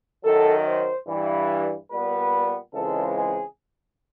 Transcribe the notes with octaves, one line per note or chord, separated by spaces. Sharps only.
F#2 D#3 F#3 A4
C5
G2 E3 G3
A#2 G3 B3 B4
C#2 C#3 E3 G#3 C4 A4
G#4